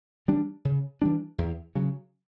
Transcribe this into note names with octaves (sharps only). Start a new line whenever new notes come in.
E3 G3 D4
C#3
E3 G3 D4
E2
C#3 F#3